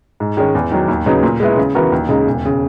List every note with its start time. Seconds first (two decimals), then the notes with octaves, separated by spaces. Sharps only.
0.20 G#2
0.37 D#3 G#3 C#4
0.55 E2
0.71 D#3 F#3
0.88 D#2
1.06 C#3 F#3 B3 D#4
1.23 A#2
1.40 G#3 B3 E4
1.57 C#3
1.75 E3 B3 F#4 A#4
1.92 D#2
2.09 C#3 G#3 D#4
2.27 E1
2.45 C#3